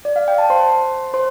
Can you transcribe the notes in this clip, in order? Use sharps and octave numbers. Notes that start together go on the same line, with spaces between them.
D5
F5
G5
A5
C5 C6
C5 C6